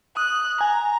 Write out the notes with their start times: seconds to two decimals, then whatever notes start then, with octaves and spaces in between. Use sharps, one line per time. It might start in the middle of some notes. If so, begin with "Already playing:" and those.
0.17 D#6 F#6
0.61 G#5 A#5